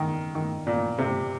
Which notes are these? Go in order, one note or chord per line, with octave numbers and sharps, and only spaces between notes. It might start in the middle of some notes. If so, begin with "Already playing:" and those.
Already playing: D#3
D#3
A#2
C3